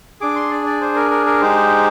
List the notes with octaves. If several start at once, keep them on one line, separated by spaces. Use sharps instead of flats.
D4 G#4 D6
C6
D5
D5
C5
A#4
A#4
A#4
G#3 D#4 G4 C5